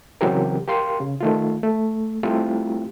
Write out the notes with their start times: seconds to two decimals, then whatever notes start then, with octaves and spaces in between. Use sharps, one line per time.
0.21 C#3 E3 F#3 C4 G4 A#4
0.68 G4 A#4 F5 C6
1.00 C#3
1.21 D#3 A3 F4
1.63 A3
2.23 G3 A3 C4 E4 F4 G4